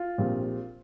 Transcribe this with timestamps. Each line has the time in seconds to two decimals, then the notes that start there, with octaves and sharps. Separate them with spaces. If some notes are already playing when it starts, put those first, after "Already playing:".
Already playing: F4
0.18 A#1 A#2 G3 C4